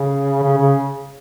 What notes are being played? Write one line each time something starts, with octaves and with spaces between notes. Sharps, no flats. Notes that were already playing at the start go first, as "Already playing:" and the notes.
Already playing: C#3
C#3
C#3